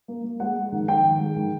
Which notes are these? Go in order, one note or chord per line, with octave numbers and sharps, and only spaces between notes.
A#3
A#3
G#3 F#5
G#3
D#3
D#3 G5
D#3
G#3
D#3